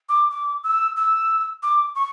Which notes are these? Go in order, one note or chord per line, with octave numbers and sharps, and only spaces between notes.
D6
D6
E6
E6
D6
C#6